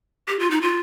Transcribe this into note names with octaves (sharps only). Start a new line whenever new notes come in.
G4
F4
D#4
F4